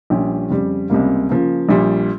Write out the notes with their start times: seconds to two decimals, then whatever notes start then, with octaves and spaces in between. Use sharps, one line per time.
0.10 A#1 A#2 G3 C#4 G4
0.51 F2 C#3 G3
0.90 C#2 C3 G3 A#3
1.30 C#3 F3 A#3
1.69 A#1 A#2 G3